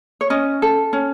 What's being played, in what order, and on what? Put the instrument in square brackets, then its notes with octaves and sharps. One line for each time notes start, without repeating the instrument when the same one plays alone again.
[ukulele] C#5
C#4 D#5
A4
C#4